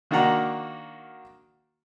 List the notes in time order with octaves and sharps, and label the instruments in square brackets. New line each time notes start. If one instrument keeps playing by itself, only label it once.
[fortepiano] D#3 A#3 D4 F#4 F#5 A#5